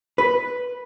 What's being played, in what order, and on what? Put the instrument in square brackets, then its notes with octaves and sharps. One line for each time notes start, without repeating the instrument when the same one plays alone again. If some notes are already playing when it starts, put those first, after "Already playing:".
[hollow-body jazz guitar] B4